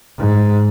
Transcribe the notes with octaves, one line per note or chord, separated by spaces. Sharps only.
G#2